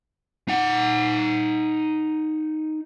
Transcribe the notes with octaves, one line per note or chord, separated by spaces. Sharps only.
D#4 F#5